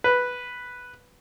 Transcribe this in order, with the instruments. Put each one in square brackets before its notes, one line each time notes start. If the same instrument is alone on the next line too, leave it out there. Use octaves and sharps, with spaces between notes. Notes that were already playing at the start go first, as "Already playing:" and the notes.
[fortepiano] B4